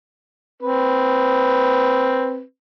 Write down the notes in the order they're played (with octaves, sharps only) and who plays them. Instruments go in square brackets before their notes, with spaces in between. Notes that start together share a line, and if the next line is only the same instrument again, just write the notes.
[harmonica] C4 B4